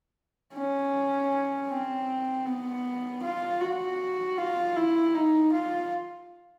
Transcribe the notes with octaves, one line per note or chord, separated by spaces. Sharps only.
C#4
C4
B3
F4
F#4
F4
E4
D#4
F4